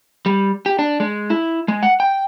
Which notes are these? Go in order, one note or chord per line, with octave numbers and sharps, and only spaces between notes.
G3
G4
D4
G#3
E4
G#3
F#5
G5